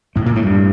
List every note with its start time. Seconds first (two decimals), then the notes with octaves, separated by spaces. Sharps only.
0.16 A2 A3
0.26 A#2 A#3
0.36 A2 A3
0.45 G2 G3